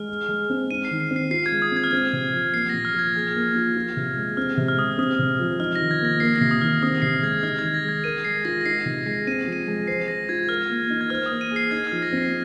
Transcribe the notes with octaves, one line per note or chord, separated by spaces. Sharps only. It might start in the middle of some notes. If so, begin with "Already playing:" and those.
Already playing: G#3 F6
G#4
G#3
C4
D#4 D#7
C7
D#3
C7
C4
C7
F4 C7
G#6
G#3
D#6
C4
G#6
F6
C4 G#6
C3
F3
A#3 C7
A#2 A#6
F6
F3 G#6
G#4
A#3
F4
F4
C3
G#3
C4 F6
C3
F6
G#3 D#6
C4 D#6
C3
F3
D#4 F6
A#6
D#3
G#6
A#3 A#6
A#3 C7
A#6
C3 C7
D#6
D#3 F6
C4 D#6
C3 C7
G#3 G#6
D#4 F6
D#3 G#6
A#6
G#3 G#6
A#4 D#7
G#3 C7
F4 A#6
A#6
D#4 C7
C3
G#3 C7
C4 D#7
F3
D#7
G#3
C5 C7
G#3 A#6
F4 G#6
A#4 F6
A#3
D#4
G#6
C5 F6
A#3 D#6
D#7
G#4
C7
D#4 G#6
F6
F3
A#6
C4
C7